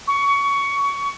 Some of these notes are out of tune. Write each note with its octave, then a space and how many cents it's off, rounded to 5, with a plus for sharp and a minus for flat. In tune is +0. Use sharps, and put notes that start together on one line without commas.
C#6 +20